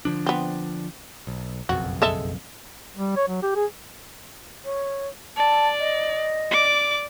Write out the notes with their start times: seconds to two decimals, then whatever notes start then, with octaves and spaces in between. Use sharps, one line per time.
0.05 D3 F3 D4
0.26 B3 C4
1.27 B1
1.69 F#1 B1 F2 F#4
2.02 G#3 A4 E5
2.96 G3
3.16 C#5
3.28 F#3
3.43 G4
3.56 G#4
4.65 C#5
5.37 D5 A5
5.80 D#5
6.51 D5 D6